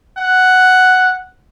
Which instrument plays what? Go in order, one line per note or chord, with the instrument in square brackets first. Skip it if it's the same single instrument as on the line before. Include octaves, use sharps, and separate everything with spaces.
[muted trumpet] F#5